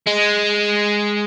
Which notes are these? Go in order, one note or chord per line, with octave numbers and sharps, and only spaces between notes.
G#3